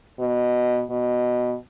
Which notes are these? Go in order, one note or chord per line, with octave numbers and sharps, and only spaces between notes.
B2
B2